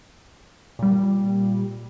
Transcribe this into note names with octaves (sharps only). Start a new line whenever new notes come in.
A#2 G3